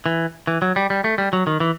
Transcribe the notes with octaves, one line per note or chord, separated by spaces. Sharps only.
E3
E3
F#3
G3
G3
A3
G3
F#3
D#3
E3